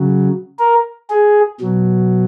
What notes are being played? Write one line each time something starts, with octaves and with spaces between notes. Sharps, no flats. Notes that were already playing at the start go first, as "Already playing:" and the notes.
Already playing: C#3 F#3
A#4
G#4
B2 F#3